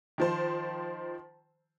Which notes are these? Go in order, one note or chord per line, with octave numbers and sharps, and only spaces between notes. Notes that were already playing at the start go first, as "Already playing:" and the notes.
D#3 F3 C5